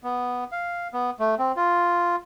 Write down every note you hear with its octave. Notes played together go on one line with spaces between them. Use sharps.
B3
F5
B3
A3
C4
F4